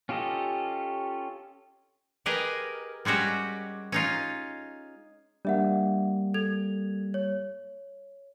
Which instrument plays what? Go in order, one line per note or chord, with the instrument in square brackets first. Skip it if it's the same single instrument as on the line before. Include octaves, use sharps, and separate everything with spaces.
[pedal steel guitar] C#4 F4 G4 A4 D#5
[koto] G4 G#4 A#4 B4 D#5
G3 G#3 C#4 F#4 G4
C#4 D#4 F4
[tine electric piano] G3 A#3 [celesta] D4 E5 F#5
[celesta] A4 G#6 F7
C#5